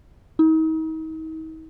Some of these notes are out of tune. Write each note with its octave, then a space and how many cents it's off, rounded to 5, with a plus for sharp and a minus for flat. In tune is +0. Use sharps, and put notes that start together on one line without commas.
D#4 +40